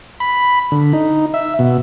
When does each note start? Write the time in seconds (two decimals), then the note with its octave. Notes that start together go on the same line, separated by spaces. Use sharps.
0.20 B5
0.72 D3
0.93 D#4
1.34 E5
1.59 B2